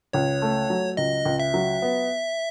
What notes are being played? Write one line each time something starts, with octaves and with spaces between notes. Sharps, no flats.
C#2 C#5
A3
F#3
C#2 D#5
C#2
E5
F#3
B3